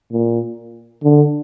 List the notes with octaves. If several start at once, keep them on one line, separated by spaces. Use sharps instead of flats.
A#2
D3